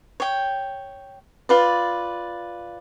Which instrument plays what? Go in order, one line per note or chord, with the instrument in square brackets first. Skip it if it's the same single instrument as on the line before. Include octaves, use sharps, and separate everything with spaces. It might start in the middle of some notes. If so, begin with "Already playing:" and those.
[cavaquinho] C#5 G5
F4 B4 D5